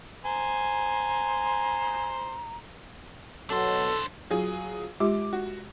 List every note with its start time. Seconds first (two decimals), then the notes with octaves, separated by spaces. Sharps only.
0.25 C5 G#5 A#5
3.50 B2 F#3 D4 A4 C5
4.30 F#3 F4 G#4
5.00 G#3 F4 G4 D6
5.33 F#4